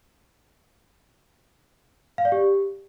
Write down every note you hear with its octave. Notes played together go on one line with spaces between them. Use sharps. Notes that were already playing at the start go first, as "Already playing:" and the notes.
F5
D5
G4